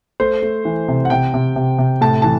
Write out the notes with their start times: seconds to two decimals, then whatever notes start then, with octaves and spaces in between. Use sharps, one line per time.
0.20 A3 C5
0.42 A3
0.65 E3
0.88 C3
1.05 F#5
1.10 C3 G5
1.34 C3
1.56 C3
1.78 C3
2.01 A2 A5
2.22 E3 A5